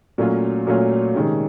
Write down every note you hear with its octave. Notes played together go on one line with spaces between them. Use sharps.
A#2 F#3 A3 C#4 F4
A#2 F#3 A3 C#4 F4
C3 D#3 G#3 C#4